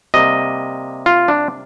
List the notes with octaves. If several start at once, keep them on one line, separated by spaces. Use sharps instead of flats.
C3 G3 A#3 D#5
F4
D4